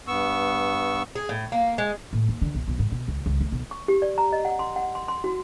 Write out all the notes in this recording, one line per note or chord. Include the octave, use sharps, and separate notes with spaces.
G2 B3 C#6 E6
G#4
A2
A#3
G#3
A2
D#2
D3
B1
B1
G#2
B2
C#2
C#2
A3
B1
C#6
G4
D5
A#5
D#5
F#5
C6
F#5
C6
C6
F#4